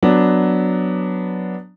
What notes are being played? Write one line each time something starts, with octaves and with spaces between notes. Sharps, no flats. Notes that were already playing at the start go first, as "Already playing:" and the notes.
F#3 B3 D4